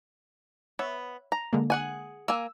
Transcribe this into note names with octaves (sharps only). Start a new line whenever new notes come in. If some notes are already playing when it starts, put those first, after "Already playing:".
B3 C#5 E5
A#5
D3 G#3 A#3
G#4 F#5 G#5
A#3 G#5 E6